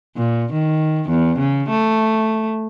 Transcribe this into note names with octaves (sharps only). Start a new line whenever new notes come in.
A#2
D#3
E2
C#3
A3